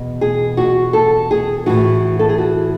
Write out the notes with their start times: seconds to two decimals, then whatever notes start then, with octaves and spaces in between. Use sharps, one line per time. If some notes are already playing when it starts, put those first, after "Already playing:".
Already playing: E2 B2
0.21 G#4
0.57 F#4
0.93 A4
1.31 G#4
1.66 A2 E3 F#4
2.19 A4
2.29 G#4
2.38 F#4